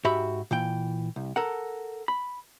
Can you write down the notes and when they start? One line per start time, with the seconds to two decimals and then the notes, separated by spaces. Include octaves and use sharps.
0.04 G#2 F#4 G4 E5 B5
0.51 A#2 E3 G5
1.16 C2
1.36 A4 A#4 F#5
2.08 B5